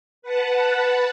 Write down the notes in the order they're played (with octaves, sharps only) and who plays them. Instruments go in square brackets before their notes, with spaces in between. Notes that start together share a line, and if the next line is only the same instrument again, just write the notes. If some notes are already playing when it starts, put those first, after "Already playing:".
[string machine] B4 F#5 A5